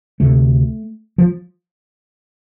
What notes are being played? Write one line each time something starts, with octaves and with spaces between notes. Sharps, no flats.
D2 C3 A3
F3